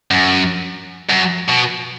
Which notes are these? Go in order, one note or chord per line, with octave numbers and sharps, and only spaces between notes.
F#2
F#2
B2